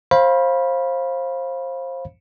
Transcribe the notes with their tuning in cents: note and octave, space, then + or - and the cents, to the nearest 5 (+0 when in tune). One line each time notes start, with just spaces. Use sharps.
C5 +25 F5 +0 B5 -20